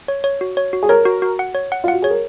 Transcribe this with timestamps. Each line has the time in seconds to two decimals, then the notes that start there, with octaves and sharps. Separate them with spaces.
0.08 C#5
0.24 C#5
0.41 F#4
0.57 C#5
0.73 F#4
0.83 G#4
0.89 A#4 C#5
1.05 F#4
1.22 F#4
1.39 F#5
1.55 C#5
1.72 F#5
1.84 F4
1.88 F#4 F#5
2.02 G#4 C#5
2.11 A#4